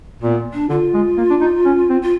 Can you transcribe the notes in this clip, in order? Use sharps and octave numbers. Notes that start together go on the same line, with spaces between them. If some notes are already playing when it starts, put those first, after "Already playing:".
A#2 B3
D4
D3 F4
G#3
A#3
D4
D#4
C#4
C4
F4